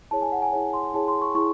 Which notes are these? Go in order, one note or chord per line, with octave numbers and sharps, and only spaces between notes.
E4 G#4 C#5 A5
G#5
F#5
G#5
E4 G#4 C#5
C6
E4 G#4 C#5 A5
C6
C#6
E4 G#4 C#6